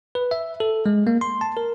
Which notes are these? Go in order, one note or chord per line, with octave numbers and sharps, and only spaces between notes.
B4
E5
A4
G#3
A#3
C6
A5
A#4